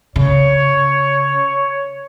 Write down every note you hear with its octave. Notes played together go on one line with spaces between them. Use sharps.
C#3 C#5